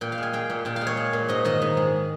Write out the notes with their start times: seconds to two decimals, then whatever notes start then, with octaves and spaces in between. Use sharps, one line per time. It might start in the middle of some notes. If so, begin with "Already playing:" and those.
0.01 A#2 G5
0.12 F5
0.18 G#3 G#5
0.33 G#3 G5
0.50 A#2
0.65 A#2 G5
0.76 F5
0.81 G#3
0.87 C#5
0.97 G#3
1.13 A#2
1.28 G#2 D#5
1.45 D#3 D#5
1.62 G#2
1.77 G#3